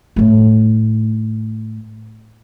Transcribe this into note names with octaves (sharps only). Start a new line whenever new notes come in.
A2 A3